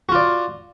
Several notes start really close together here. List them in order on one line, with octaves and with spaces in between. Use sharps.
F#4 F4 D5